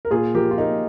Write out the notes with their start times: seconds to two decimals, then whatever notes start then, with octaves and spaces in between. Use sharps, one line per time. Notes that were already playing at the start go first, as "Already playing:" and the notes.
0.05 A#4
0.11 A#2 F4 G#4
0.35 F3 G4 A#4
0.51 F4
0.58 A#3 D#4 G4